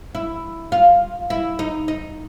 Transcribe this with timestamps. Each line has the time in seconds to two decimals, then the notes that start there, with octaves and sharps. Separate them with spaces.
0.15 E4
0.72 F4
1.30 E4
1.59 D#4
1.88 D#4